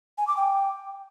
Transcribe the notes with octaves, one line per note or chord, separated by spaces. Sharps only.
G#5
D6
G5